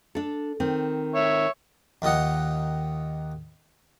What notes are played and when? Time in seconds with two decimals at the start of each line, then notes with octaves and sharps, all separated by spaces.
0.15 D4 A4
0.60 D#3 C4
1.15 C#5 E5
2.02 D#2 D#3 F4 D#5 F#5